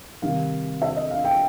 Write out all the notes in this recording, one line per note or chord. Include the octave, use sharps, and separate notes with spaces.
C3 D#3 G3 F5
E5
D#5
F5
G5